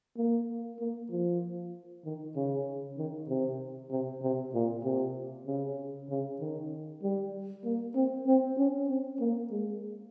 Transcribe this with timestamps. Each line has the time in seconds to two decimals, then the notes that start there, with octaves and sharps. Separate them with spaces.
0.17 A#3
0.80 A#3
1.11 F3
2.05 D#3
2.36 C#3
2.98 D#3
3.29 C3
3.91 C3
4.22 C3
4.54 A#2
4.84 C3
5.46 C#3
6.09 C#3
6.40 D#3
7.02 G3
7.64 A#3
7.95 C4
8.27 C4
8.58 C#4
8.89 C4
9.20 A#3
9.51 G#3